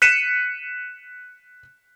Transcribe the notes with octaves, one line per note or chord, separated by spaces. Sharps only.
F#6 B6 C#7 D#7 E7